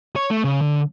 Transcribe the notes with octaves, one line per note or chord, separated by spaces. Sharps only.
C#5
A3
C#3
D3